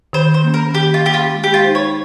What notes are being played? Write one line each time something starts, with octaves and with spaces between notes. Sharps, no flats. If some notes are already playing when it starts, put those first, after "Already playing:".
D#3 C5
C5
A#3 C#4
A#4
D#3 G4
F4
A#3 C#4 G4
F4
G#3
G4
F4
D#4 G4 C5
C#5